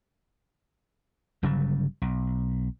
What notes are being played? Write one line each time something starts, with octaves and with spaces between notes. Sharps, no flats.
G1 C#3 F#3 G3
B1